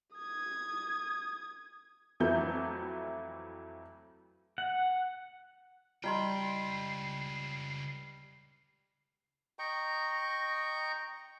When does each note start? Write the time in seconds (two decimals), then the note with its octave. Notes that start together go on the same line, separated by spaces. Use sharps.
0.15 D#6 G#6
2.20 F2 E3 F#3 A3 G6
4.58 F#5
6.04 C#2 G3 E4 D#5 G5 C6 C7
9.59 D#5 G5 A#5 C#6